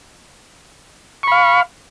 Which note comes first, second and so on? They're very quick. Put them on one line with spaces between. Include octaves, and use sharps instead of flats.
C#6 B5 F5